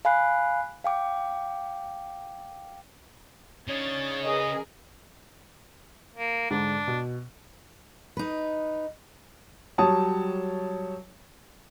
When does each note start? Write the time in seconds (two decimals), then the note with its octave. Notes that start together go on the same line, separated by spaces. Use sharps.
0.05 F5 G#5 B5 F#6 C7
0.84 F5 G5 D6
3.68 C#3 D4 D#4 C#5 A6
4.24 G#4 A#4 B4 D#5
6.15 A#3
6.50 G#2 D3 D4
6.88 B2
8.17 D#4 B4
9.78 F#3 G3 C#5 A5 D#6